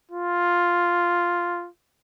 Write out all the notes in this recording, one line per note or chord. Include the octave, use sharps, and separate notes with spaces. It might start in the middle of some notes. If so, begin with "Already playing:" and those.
F4